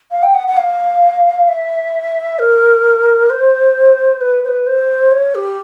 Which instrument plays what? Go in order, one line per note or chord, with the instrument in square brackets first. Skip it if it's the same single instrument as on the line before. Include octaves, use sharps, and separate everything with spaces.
[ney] F5
G5
F#5
F#5
F5
E5
A#4
C5
B4
C5
B4
C5
C#5
G4